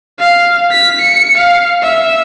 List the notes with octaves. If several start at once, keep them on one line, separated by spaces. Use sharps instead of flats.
F5
B6
C#7
F5
E5